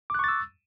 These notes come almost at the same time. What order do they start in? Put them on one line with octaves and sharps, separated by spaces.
D6 F#6 C#6 A6 E6